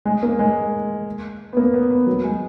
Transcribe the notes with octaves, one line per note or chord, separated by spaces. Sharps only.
G#3
A#3
G#3
B3
A#3
B3
B3
F#3
G#3